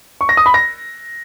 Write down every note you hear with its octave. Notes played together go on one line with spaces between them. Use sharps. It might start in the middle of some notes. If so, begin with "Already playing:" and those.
C#6
A#6
D#6
B5
A#6